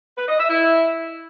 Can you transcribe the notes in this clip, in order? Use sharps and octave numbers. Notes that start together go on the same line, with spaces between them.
B4
D#5
E5
E4